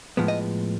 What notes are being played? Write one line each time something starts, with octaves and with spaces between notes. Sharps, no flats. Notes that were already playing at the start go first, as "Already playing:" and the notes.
A2 F3 G#3 B3
D#5